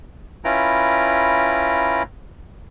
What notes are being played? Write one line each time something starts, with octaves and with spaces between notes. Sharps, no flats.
C#4 E4 F4 B4 G5 A#5